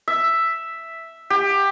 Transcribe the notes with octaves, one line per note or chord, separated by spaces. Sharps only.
E5
G4